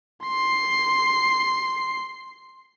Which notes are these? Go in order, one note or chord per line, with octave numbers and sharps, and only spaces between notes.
C6 C7